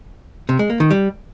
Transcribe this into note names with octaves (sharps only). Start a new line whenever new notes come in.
C3
G#3
A#3
D#3
G3